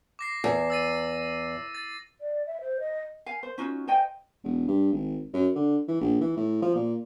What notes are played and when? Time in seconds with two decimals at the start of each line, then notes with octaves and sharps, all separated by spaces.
0.19 D6 A#6 C7
0.44 E2
0.70 E6 A6 D#7
1.75 A6
2.21 D5
2.46 E5
2.61 C5
2.80 D#5
3.26 F5 G#5
3.43 C5
3.58 C#4 D#4 F4 F#4
3.88 C5 D#5 G5 G#5
4.44 E1
4.68 G2
4.92 G#1
5.33 F#2
5.55 D3
5.88 E3
6.01 A#1
6.21 E3
6.37 A2
6.62 F3
6.75 A#2